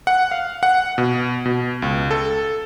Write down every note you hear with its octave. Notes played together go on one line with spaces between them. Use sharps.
F#5
F5
F#5
B2
B2
C#2
A4